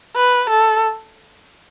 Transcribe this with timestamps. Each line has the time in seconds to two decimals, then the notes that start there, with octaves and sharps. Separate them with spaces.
0.17 B4
0.50 A4